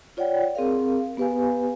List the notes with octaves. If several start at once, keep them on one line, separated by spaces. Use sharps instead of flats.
F4 C#5 D5 F#5 G5
C4 G#4 A#4 F5
B3 G4 B4 F5 G#5